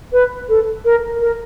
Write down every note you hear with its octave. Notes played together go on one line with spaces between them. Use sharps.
B4
A4
A#4
A#4